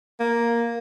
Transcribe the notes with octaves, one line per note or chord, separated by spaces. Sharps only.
A#3